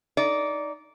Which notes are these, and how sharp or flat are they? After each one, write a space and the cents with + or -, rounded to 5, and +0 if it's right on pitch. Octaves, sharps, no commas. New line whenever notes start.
D#4 +0 D5 -15